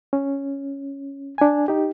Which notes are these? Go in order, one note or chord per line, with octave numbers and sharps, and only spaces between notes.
C#4
D4 G#5
D#4 G4